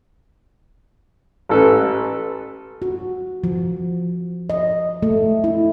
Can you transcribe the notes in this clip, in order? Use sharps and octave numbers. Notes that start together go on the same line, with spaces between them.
A1 A4 B4
F#4
F3
D#5
A3
E4